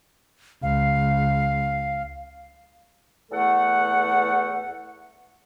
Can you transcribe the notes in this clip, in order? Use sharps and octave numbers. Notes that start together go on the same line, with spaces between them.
C#2 F5
E2 A3 A4 F#5